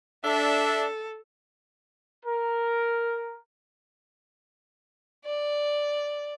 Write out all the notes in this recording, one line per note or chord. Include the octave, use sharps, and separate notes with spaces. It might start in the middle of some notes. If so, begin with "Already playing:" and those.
D4 A4 E5
A#4
D5